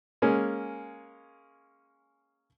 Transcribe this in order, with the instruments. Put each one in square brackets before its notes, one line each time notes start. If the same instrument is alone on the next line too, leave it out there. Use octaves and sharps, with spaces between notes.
[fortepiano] G#3 A#3 C#4